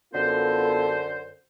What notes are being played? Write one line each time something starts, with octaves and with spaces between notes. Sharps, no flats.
F#2 D3 B3 F4 A4 C5